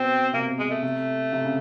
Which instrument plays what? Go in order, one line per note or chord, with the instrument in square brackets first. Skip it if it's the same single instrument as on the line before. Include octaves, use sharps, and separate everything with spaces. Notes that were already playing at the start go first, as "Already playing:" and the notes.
Already playing: [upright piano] B2 [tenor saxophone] C4
[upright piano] C3 [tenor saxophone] A#3
[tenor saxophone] G#3
A3
[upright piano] C3
C3
C#3